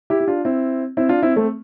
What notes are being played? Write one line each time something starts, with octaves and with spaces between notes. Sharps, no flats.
E4 G4
G4
D4 F4
C4 E4
C4 E4
D4 F4
C4 E4
A3 C4